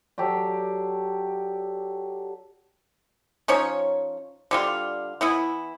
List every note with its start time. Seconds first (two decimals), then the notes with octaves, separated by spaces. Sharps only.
0.18 F#3 G4 A4 D5
3.48 F3 C#4 D#4 C#5
4.51 D3 G3 F4
5.21 E3 B3 E4